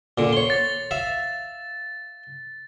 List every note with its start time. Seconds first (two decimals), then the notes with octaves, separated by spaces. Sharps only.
0.18 A#2 D3
0.33 C#5 C6
0.50 A6
0.91 E5 F5